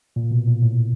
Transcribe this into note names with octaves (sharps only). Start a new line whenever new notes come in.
A#2
B2
A#2
A2